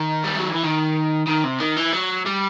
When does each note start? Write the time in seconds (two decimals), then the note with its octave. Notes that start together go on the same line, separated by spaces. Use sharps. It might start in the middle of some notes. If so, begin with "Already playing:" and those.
Already playing: D#3
0.24 G3
0.37 F#3
0.50 E3
0.63 D#3
1.28 D#3
1.45 C3
1.60 D#3
1.77 E3
1.92 F#3
2.26 G3